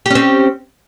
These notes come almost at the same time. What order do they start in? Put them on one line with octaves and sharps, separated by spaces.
G4 C#4 C4